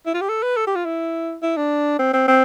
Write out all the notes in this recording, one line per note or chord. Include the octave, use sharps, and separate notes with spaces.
E4
F4
G4
A4
B4
A4
G4
F4
E4
E4
D4
C4
C4
C4